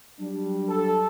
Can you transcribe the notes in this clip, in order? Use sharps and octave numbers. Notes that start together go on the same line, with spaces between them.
F#3 G3 D4
A4